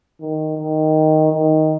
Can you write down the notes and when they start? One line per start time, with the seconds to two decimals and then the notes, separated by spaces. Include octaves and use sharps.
0.21 D#3
0.58 D#3
1.33 D#3